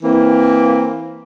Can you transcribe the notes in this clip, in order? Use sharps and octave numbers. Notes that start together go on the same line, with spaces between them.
E3 A#3 C4